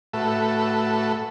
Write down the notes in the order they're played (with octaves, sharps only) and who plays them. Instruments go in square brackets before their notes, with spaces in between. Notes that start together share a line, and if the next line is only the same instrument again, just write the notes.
[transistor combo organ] A2 A3 F#4 A4 B4 E5